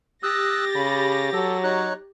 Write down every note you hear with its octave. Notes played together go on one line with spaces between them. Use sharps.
G4 D#6 E6 F#6 A6 A#6
C#3 B5
F#3 A4
D#4 C#5 F#6